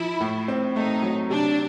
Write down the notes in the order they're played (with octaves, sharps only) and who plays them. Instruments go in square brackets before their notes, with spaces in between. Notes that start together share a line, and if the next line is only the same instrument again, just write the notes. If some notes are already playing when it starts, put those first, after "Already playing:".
Already playing: [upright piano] F3 [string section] E4
[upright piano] A2
C4
[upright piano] A3 [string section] D#4
[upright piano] F#3
[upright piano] C3 [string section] D4